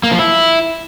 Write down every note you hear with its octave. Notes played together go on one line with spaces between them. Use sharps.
A#3
F3
E4